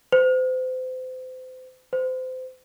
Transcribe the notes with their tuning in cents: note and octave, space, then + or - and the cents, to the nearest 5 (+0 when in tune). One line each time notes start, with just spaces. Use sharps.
C5 -35
C5 -30